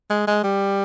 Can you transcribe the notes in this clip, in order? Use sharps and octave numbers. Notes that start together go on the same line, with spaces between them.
G#3
G#3
G3